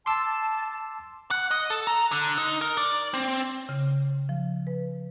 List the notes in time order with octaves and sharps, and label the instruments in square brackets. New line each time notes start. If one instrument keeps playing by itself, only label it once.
[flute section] A5 [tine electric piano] C6 D6 E6
[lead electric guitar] F#5
D#5
A4
A#5
D3
D#4
A#4
D5
C4
[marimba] C#3
F3
B4